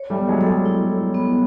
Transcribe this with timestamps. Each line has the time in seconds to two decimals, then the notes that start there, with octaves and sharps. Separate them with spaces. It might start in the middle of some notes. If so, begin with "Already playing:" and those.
Already playing: C#5
0.10 G3 A3
0.17 B3
0.28 F#3 G#3
0.41 G3 A4
0.47 F#3 G#3
0.66 E4
0.90 C#5
1.15 B3